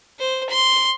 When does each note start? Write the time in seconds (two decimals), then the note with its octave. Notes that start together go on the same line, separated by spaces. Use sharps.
0.19 C5
0.50 C6